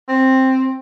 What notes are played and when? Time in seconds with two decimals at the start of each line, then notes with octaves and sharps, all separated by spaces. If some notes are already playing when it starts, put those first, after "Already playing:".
0.09 C4